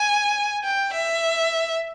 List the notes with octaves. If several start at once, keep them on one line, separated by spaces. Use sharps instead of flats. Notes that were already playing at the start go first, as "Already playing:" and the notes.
Already playing: G#5
G5
E5